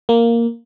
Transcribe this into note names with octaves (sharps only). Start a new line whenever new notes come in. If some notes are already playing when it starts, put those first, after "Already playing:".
A#3